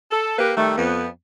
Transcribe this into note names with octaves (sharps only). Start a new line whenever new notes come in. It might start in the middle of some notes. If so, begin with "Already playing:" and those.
A4
A#3 G4 A#4 B4
D#3 G3 A3
F2 B3